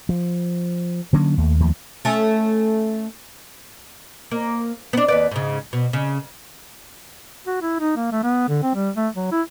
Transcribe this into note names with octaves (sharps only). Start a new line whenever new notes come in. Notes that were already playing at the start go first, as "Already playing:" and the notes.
F3
D3 F#3 A#3 C#4
D#2 A3
D#2 F3 A3
A3 C#4
A#3
B3 D4
D#2 B4 D5
G#2 C#3
B2
C#3
F#4
E4
D#4
A#3
A3
B3
D3
C4
G3
A3
F#3
E4